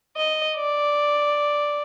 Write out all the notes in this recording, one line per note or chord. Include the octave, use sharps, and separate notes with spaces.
D#5
D5